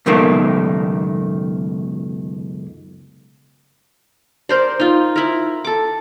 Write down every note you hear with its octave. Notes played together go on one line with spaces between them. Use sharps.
C#2 F#2 B2 D#3 A3 A#3
A#4 C5 D5
D#4 F4
E4 A#4
A4 D6